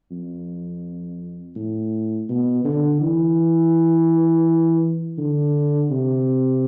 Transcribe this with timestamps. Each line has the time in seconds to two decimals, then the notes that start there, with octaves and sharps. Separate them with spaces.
0.11 F2
1.56 A2
2.29 B2
2.64 D3
3.01 E3
5.18 D3
5.90 C3